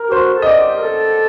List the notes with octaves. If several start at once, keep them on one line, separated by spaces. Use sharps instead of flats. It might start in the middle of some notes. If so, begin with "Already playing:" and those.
Already playing: A#4
G4
F#4 C5
A4
D#5
G4 D5
A#4
A4